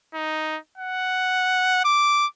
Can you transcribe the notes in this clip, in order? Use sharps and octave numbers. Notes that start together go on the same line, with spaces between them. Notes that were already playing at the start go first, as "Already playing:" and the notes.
D#4
F#5
D6